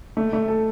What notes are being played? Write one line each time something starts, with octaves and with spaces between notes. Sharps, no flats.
A3
A3
A4